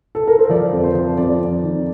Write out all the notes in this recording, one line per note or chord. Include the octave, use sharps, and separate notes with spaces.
A4
A#4
C5
F3 D5
F2
C5
F3
F2 D5
F2
D#3